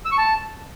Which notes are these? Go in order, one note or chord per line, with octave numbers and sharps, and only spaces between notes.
E6
C#6
A5